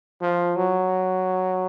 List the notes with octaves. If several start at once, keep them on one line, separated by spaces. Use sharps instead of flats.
F3
F#3